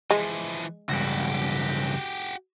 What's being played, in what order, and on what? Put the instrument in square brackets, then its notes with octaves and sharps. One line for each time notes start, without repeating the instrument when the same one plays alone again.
[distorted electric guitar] E3 F3 [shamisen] G#3
[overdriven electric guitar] C#2 G2 [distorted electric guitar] F#4 G4